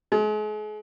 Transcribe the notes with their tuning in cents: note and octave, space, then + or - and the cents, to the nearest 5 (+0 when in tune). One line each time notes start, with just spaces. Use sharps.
G#3 +40